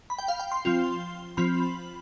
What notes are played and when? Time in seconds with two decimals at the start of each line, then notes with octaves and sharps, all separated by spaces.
0.10 B5
0.19 G5
0.28 F5
0.40 G5
0.52 C6
0.65 F3 C4 F4
1.37 F3 C4 F4 B5